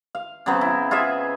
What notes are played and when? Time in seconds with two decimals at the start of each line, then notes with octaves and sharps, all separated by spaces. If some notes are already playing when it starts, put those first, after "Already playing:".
0.15 F5
0.46 C#3 F#3 B3 C4
0.61 E4
0.91 F4 G#4 D#5 E5